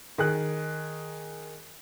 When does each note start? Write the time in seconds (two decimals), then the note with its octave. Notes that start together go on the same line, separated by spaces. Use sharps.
0.18 D#3 G#4 F#6